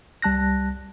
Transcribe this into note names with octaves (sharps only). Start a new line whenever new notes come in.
C2 G3 A5 F#6 A#6